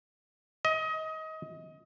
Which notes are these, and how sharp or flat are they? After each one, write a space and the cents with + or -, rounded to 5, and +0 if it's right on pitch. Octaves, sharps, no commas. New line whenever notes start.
D#5 +25